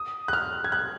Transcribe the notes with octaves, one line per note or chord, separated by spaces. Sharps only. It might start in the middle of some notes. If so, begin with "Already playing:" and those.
Already playing: D#6
F#6
F6
G#6
F#6